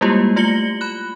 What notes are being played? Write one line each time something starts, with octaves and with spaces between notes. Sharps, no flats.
G3 G#3 A#3 E4 F4 G4
A3 F4 A#6 C#7 F#7 G7
B5 F#6